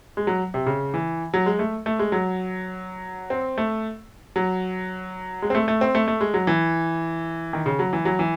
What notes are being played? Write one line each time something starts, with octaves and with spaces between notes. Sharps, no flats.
G#3
F#3
C3
C#3
E3
F#3
G#3
A3
A3
G#3
F#3
C4
A3
F#3
G#3
C4
A3
A3
C4
A3
A3
G#3
F#3
E3
D#3
C#3
F#3
E3
F#3
E3